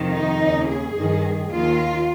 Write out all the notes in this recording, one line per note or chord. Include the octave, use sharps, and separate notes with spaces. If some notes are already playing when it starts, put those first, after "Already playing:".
Already playing: F2 C3 D#3
D#4
D#2 C#3
G#4
G2 D#3
D#2 D#3 F4